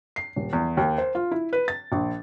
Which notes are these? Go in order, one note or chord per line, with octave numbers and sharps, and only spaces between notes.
C7
D#1
E2
D#2
C5
F4
E4
B4
A6
A#1